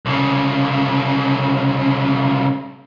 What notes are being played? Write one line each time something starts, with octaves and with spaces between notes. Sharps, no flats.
C2 C#3